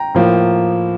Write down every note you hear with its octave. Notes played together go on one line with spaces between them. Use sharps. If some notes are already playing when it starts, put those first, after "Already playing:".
Already playing: G5 A#5
A2 F3 A#3